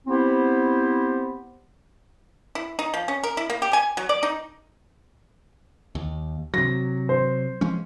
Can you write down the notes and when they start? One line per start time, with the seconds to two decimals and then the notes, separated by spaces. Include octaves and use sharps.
0.07 B3 C4 E4 G4 C5
2.55 E4
2.79 D#4
2.94 F3
3.08 C#4
3.23 A#4
3.37 E4
3.50 A#3
3.62 G4
3.73 G#5
3.97 F#3
4.09 D5
4.23 D#4
5.95 D#2
6.54 C3 F#3 A#6
7.09 C5
7.61 F3 G#3 C#4